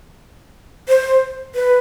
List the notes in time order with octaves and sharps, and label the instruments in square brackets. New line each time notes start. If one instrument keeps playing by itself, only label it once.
[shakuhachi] C5
B4